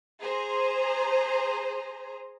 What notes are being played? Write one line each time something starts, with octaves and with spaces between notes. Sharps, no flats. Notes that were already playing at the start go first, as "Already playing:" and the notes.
G#4 C5 A#5